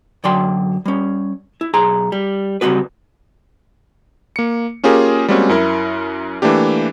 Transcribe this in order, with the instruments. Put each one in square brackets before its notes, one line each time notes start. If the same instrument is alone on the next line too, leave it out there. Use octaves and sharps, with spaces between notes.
[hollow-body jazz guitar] F#2 D3 F#3 D5 G5 C6
G3 C#4
E4
B1 G#4 A#5 C6
G3
C#3 G3 G#3 C4 F#4 B4
[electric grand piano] A#3 C#7
A#3 C#4 F4 G4 G#4 A#4
G3 G#3 A#3 C4 C#4 F#4
F#2 E4 A#4
E3 A3 A#3 D4 G4